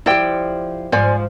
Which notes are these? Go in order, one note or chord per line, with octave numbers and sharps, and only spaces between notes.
F3 E4 G4 D5 G5
G#2 F3 C5 D5 G#5